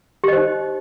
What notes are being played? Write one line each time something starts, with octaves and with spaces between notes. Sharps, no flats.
D#4 G4 C5 D#5